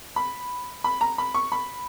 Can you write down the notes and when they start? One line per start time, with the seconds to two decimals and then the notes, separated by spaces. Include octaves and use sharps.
0.16 B5
0.84 B5
1.01 A#5
1.18 B5
1.34 C#6
1.52 B5